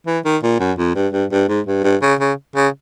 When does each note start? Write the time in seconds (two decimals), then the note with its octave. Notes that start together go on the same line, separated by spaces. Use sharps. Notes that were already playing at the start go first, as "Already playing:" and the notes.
0.06 E3
0.25 D#3
0.43 A#2
0.60 F#2
0.78 F2
0.95 G2
1.13 G2
1.32 G2
1.48 G#2
1.67 G2
1.84 G2
2.02 C#3
2.20 C#3
2.55 C#3